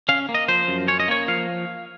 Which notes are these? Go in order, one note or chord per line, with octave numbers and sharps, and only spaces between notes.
C#4 F5
A#3
D#5
F3 C5
F#2
C#4 C#5
D#5
A#3 C#5
F3 F5